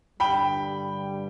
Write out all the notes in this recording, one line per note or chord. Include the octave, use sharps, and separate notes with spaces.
G2 D3 G3 G5 B5